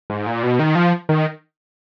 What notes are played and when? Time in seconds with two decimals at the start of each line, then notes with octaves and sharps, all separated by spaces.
0.10 G#2
0.26 A#2
0.43 B2
0.59 D#3
0.75 F3
1.09 D#3